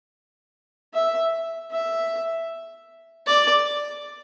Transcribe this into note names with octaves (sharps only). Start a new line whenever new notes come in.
E5
E5
D5